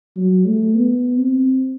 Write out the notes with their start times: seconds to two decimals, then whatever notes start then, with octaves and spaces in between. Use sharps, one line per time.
0.16 F#3
0.46 A3
0.75 B3
1.18 C4